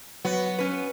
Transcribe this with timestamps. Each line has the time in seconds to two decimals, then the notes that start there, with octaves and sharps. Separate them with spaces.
0.25 F#3 B3 F#4
0.58 C#4 B4